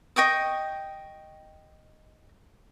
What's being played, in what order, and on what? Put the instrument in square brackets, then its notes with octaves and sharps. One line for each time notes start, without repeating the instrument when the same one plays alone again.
[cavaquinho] D#5 G5 C#6 D#6